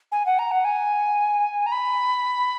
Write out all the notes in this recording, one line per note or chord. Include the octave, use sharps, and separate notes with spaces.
G#5
F#5
A#5
F#5
G#5
A#5
B5